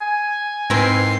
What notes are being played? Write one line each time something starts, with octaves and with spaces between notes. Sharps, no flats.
G#5
G#2 C4 E4 A#4 C7